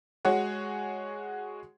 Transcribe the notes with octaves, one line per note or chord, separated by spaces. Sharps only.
G#3 F#4 G#4 C#5 F#5